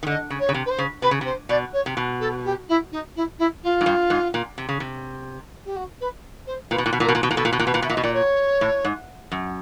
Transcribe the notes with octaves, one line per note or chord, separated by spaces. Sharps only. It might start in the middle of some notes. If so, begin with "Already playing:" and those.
D#3
D3 D#5
C#3
C#5
C#3
C3
B4
C5
C#3
C3 B4
C#3
C3
C5
B2 D5
C#5
C3
B2
A4
G4
E4
D#4
E4
E4
F4
G#2
G2
G#2
A#2
C3
C#3
C3
G4
F#4
B4
C5
A#2 B4
B2
A#2
B2
A#2 A#4
B2
A#2
B2
A#2
B2 A4
A#2
B2
A#2
B2 B4
A#2
B2 E5
A#2
B2 D#5
A#2 D5
C#5
A2
G#2
F#2